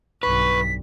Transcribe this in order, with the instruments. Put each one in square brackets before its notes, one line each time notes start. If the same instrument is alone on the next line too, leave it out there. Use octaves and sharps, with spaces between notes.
[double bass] B1 G2 [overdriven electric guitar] B4 [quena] C#6 [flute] B6